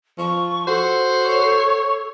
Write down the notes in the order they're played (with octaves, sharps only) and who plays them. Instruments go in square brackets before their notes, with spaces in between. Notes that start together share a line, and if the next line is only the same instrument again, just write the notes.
[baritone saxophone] F3 [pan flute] C#6
[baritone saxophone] F#4 [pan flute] A4 [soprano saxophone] C5
[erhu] C#5